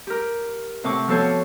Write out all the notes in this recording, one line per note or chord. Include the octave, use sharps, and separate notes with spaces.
G4 A#4
A2 C3 C4 F#5 C#6 D6
F3 B3 F#4 A4 C5 C#5